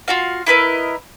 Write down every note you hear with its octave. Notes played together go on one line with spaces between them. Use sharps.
F4 F#4 F5
E4 A#4 B4 D#5